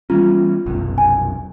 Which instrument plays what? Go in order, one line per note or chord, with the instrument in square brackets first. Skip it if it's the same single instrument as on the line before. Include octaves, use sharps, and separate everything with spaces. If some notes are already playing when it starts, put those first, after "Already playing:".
[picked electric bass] E3 G3 C#4 [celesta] F4
[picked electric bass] F1 B1 F#2
[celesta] G#5